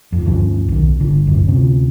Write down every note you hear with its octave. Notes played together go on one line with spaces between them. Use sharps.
F#1 F2
D2 G2 F3 C#4
B1 D#3
G1 D3
D1 G#1 C#2 F#2
D2 C3 C#4